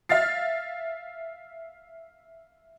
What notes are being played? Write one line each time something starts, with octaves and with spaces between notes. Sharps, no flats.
E5 F5 F6 A6 C7